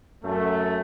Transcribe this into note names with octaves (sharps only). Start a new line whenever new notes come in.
F#2 A3